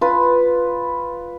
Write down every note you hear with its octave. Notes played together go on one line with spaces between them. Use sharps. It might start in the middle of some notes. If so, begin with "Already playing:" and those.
F4 B4